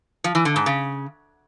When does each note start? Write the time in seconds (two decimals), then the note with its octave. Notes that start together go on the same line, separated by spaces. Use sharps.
0.24 F3
0.35 E3
0.45 D3
0.56 G#2
0.66 C#3